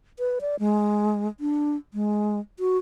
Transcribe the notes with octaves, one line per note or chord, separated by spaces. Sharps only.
B4
D5
G#3
D4
G#3
F#4